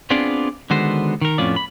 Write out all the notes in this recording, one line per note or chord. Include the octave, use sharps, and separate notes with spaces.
B3 C4 D4 F4 G#4 D5
D3 D#3 G#3 B3 F#4 C5
D#3 A#4
F2 A2 B3 C#4 F4 D5
B5